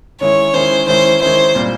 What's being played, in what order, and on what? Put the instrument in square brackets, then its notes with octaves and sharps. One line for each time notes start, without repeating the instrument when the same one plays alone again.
[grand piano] D#3 G#3 C#4 E4 [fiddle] C#5
[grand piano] D#3 G#3 C#4 E4 [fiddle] C5
[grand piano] D#3 G#3 C#4 E4 [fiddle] C5
[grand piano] D#3 G#3 C#4 E4 [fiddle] C5
[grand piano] A#2 G3 C4